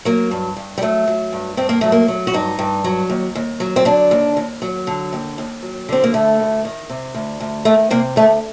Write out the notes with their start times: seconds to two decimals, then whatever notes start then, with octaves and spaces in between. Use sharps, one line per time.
0.05 F#3 A#3
0.31 G2
0.57 G2
0.78 G3
0.82 F#3 A3
1.07 F#3
1.32 G2
1.57 G2 C4
1.69 A#3
1.81 F#3 A3
1.92 A#3
2.08 F#3
2.27 F#4
2.33 G2 D#4
2.59 G2
2.84 F#3
3.10 D#2
3.35 D#2
3.60 F#3
3.76 C4
3.85 D3 D4
4.11 D#2
4.37 D#2
4.62 F#3
4.87 D3
5.13 D#2
5.38 D#2
5.62 F#3
5.89 D3 C4
6.04 A#3
6.14 D2 A3
6.40 D2
6.65 D#3
6.90 C3
7.14 D2
7.40 D2
7.65 D#3 A3
7.90 C3 A#3
8.16 D2 A3